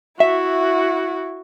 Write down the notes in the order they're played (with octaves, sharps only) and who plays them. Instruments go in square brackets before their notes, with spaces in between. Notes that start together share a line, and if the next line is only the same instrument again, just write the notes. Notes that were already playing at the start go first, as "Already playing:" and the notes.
[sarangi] E4 [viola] F#4 [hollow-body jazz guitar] E5